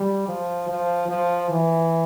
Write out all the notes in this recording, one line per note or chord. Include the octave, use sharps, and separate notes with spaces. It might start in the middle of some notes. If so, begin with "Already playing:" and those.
Already playing: G3
F3
F3
F3
E3